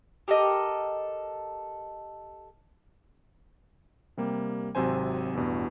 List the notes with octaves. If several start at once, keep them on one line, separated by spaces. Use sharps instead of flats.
G4 A4 A#4 D#5
C3 G3 A#3
G#1 C3 F#3 C5 G#5
A1 E2 G2 B2